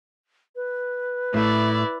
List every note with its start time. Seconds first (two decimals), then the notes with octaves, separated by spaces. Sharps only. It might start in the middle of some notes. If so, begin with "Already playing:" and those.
0.56 B4
1.34 A2 A3 E4 D5